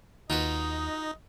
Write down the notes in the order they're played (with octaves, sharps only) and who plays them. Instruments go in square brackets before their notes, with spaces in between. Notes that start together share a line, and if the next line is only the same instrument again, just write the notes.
[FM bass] D#2 [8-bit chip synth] D#4 [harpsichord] F4 F#4 B4 [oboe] D#5